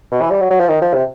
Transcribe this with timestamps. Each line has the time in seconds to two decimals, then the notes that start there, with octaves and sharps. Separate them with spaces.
0.12 B2
0.21 E3
0.31 G3
0.41 F#3
0.51 F#3
0.60 F3
0.69 D#3
0.82 F3
0.94 C3